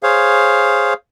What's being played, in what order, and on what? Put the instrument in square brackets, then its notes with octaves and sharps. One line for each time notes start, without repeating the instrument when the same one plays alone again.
[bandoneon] G#4 C5 C#5 F5